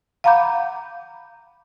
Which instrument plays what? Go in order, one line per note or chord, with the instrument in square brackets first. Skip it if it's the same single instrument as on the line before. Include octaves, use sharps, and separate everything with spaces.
[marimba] F5 F#5 A#5 B5 D6 G6